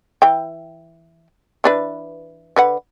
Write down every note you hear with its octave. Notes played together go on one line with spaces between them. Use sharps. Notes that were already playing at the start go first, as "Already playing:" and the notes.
E3 G5
E3 D4 B4
D3 B4 F#5